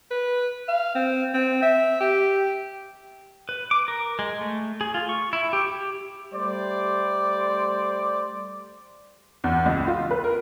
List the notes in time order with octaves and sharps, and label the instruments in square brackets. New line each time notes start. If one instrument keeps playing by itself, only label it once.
[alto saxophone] B4
F5
C4
C4
E5
G4
[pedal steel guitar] B4
D6
A#4
G#3
A3
G#4
F4
C#6
E4
G4
G4
[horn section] G3 A3 C5 D5
[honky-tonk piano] E2
C#2
F4
B4
A#4